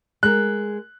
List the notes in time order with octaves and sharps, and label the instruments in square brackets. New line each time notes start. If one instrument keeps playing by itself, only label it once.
[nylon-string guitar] G#3 A#4 [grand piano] F#6